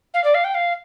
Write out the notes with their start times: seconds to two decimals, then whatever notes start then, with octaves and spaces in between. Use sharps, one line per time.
0.14 F5
0.24 D5
0.34 F5
0.44 G5
0.54 F5